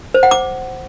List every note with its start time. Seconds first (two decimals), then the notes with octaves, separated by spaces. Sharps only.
0.14 C5
0.23 F#5
0.31 D6